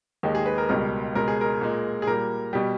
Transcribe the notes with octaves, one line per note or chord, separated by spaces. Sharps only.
D#2 D#3 G#3 G4
G#4
B4
A#4
C#2 B2 G3 A#4
C#2 B2 G#3 A#4
G#4
A#4
A#2 G#3
G#4
A#2 G3 A#4
B2 G3 G4